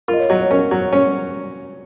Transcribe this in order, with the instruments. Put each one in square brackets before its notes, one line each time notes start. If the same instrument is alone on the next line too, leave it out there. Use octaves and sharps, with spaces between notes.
[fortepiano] F4 [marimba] A#4
[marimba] D#5
C#5
[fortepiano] F#3 [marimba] D#5
[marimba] C#5
[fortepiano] C#4 [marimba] A#4
[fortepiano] F#3
C#4